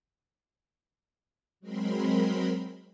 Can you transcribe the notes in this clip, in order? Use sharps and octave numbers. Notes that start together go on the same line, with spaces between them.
F#3 G#3 C4 A#4 B5 C6